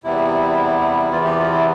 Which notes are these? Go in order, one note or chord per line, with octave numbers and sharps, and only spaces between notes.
E2 C3 G3 B3 E4
E2 C3 E3 B3 F4
G4
F4
E4